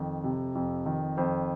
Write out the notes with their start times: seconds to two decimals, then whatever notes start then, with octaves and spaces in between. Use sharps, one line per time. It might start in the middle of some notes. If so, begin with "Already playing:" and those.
Already playing: F2 D#3
0.24 C3
0.55 F2
0.86 D#3
1.17 F2 C5